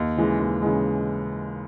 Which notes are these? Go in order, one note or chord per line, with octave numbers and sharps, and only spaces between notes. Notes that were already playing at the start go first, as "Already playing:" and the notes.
Already playing: D#2
C#3 E3 G#3
D#2
C#3 E3 G#3